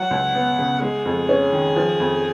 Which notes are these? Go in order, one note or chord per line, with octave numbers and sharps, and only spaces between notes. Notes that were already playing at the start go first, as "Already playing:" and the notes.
Already playing: F#3 F#5
C#2
B3
C#3
G#3 G#4
F2
C#4
D#3
F3
F2